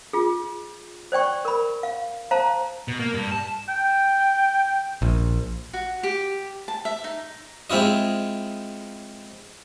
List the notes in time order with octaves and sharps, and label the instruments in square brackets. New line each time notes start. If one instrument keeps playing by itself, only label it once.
[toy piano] F4 G#4
C5 D5 G5 C#6
A#4 B5
F5
C5 F5 A5 A#5
[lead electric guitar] B2
A#3
G2
A5
[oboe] G5
[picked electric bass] A#1
[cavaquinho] F#4
G4
A5
E5
D#4
[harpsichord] G#3 C4 E4 F4 D#5